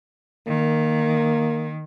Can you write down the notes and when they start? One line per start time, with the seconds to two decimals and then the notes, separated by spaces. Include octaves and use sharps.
0.47 D#3 A#3